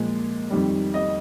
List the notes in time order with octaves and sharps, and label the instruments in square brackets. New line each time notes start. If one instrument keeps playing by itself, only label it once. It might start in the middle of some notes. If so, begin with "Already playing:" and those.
Already playing: [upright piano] A#2 F3 G#3
F2 D#3 G3
D#5